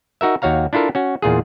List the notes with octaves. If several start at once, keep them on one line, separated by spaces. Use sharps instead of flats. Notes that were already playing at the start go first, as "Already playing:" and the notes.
D#4 F#4 A#4 E5
D#2 F#4 C#5 F5 A#5
D4 E4 F4 A4 A#4
C#4 F#4
E2 A#2 F4 G#4